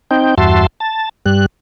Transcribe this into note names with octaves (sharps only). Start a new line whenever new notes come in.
C4 D#4 G5
E2 G2 F#4 E5 A5 C6
A5
G2 G3 F#6